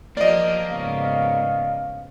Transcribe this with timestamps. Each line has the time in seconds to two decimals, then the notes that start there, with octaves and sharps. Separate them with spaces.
0.17 F3 A#3 G4 D5 D#5
0.69 G#2 C#3 B3 F5